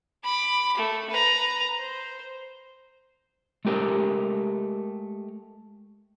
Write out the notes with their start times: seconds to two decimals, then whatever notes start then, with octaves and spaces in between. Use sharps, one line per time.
0.24 B5 D6
0.77 A3
1.10 B4 A#5
1.78 C5
3.65 G#3 A3 G4 A#4